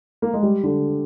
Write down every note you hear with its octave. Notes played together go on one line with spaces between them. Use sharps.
A#3
G#3
G3
D3